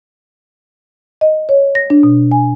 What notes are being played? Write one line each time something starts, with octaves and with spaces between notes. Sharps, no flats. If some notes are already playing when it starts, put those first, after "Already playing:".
D#5
C#5
A#6
D4
B2
G#5